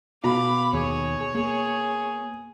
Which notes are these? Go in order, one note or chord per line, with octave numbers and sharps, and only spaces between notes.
B2 F5 B5 D6
D#2 G#4 C#5
A#3 G#4